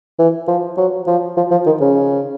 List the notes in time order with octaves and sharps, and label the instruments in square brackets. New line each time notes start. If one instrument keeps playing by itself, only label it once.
[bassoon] E3
F3
F#3
F3
F3
F3
D#3
C#3